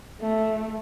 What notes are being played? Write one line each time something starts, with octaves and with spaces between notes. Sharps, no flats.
A3